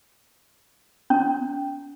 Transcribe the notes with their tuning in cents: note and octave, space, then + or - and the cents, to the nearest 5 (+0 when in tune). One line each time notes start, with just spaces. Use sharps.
C#4 +45